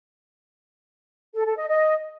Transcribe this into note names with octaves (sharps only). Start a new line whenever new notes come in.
A4
A4
D#5
D#5